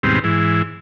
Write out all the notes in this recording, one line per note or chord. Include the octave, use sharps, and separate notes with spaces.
D#2 G#2 B2 G3 C4
G#2 E3